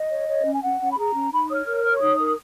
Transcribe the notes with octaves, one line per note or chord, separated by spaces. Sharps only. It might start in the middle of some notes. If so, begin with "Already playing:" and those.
Already playing: D#5
C#5
C#5
C#4
G#5
C#4 F#5
C#4
B5
G#4 A#5
C#4
D#4 B5
C#5 D#6
F6
A#4
F6
C#5
C#6
D#4 D#6
A#4